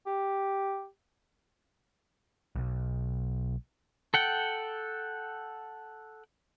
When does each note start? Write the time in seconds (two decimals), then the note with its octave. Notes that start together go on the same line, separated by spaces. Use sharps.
0.06 G4
2.56 B1
4.14 A4 F#5 G5